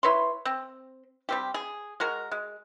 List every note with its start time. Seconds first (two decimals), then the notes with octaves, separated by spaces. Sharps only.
0.03 E4 B4 C#5 C6
0.45 C4
1.29 G3 C4 G4
1.54 G#4
2.00 G#3 F#4 A#4
2.32 G#3